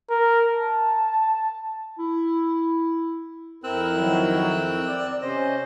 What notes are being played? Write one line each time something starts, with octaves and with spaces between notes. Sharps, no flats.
A#4
A5
E4
F2 C4 E4 A#4 E6 F#6
D#3 F#3
D5
C3 C#4 C5 D#5